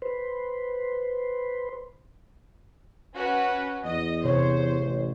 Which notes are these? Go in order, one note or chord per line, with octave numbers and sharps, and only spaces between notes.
B4 C5
C#4 F#4 B4
E2 D#5
C3 C5 C#5
A1